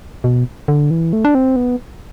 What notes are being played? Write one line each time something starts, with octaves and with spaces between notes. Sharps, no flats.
B2
D3
E3
A3
D4
C4
B3